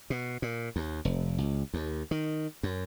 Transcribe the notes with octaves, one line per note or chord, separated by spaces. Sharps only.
B2
A#2
D#2
F1
C#2
D#2
D#3
F#2